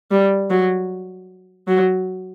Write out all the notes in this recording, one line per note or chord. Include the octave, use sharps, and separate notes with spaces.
G3
F#3
F#3